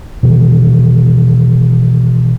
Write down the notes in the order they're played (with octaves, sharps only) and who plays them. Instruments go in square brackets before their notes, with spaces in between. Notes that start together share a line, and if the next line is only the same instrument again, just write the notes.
[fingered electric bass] B2 D#3 E3